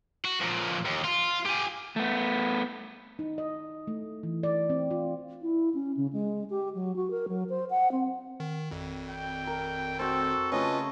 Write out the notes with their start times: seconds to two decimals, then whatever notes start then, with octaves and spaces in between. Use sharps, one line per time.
0.25 F#4
0.41 F2 A#2
0.86 D#2
1.05 F4
1.46 G4 G#5
1.96 A3 B3
3.19 D#4
3.38 D#5
3.87 A3
4.23 E3
4.43 D5
4.70 C4
4.91 F4
5.42 E4
5.74 C#4
5.97 C#3
6.13 G#3
6.50 G4
6.75 F#3
6.96 F#4
7.11 A#4
7.28 F#3
7.49 C5
7.70 F#5
7.92 C4
8.40 D#3
8.71 G#1 F2
9.10 G5
9.47 A#4
9.99 C4 F#4 A4
10.52 C#3 A3 C#4 F4 B4 D#5 C#6